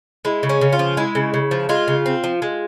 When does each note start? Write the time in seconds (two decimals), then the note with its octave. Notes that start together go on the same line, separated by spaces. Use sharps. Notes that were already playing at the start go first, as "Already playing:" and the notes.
0.25 G#3 E4
0.43 C#3
0.49 C#4
0.61 C#3
0.72 F4
0.79 F3
0.97 G#3 E4
1.15 C#3
1.34 C#3
1.51 F3
1.69 G#3 F4
1.88 C#3
2.06 C4
2.24 F3
2.42 G#3